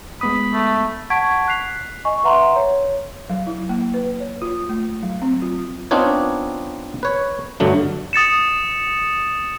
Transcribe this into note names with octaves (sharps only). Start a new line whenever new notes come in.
G#3 B3 B5 D#6
A3
F#5 A5 C#6 G#6 B6 D7
F#6 B6 C7 F7
D#5 G#5 C#6
B4 E5 F#5 A#5 C6
C#5
F#3
E4
A#3
B4
C#5
F4
A3
F#3
C4
F4
B3 C4 D4 D#4 F4 C#5
B4 C#5
G2 D3 F#3 A3
D#6 A6 C#7 E7